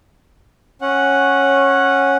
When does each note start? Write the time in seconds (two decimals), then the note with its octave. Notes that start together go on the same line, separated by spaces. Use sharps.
0.82 C#4 F#5